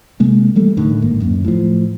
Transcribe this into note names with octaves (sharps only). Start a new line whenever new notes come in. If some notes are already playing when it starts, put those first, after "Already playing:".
C3 G#3 A#3
E3 G3 A3
A2 D3 D#3
G#1 G#2 A#3
D1 F#2
A2 F3